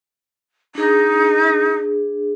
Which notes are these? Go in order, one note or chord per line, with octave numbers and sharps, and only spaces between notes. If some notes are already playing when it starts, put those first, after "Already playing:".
D4 D#4 G#4